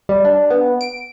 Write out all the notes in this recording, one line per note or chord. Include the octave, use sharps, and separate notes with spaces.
G3
D4
B3
D7